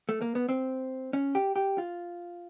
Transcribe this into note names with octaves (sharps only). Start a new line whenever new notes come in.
A3
A#3
B3
C4
C#4
G4
G4
F4